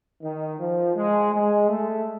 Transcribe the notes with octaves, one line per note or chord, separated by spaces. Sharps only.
D#3
F3
G#3
G#3
A3